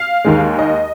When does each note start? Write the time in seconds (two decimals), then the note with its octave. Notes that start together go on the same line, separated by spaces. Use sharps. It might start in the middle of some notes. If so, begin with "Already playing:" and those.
Already playing: F5
0.25 D#2 D#3 G#3
0.59 D#5